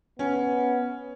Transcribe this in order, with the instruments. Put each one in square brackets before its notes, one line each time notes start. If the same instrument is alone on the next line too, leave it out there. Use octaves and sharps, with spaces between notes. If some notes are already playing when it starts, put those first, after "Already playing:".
[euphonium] B3 [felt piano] C#4